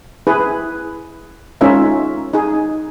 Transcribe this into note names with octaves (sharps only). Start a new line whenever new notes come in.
E4 G#4 B4
G#3 C#4 D#4 F4 A#4 E5
D#4 G#4